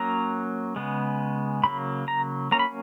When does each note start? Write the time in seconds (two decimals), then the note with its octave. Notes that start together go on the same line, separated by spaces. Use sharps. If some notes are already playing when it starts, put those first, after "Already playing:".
Already playing: F#3 A#3 C#4 A#5
0.76 C#3 G#3 B3
1.64 C#3 F#3 A#3 B5
2.08 A#5
2.51 F#3 A#3 C#4 A#5
2.59 B5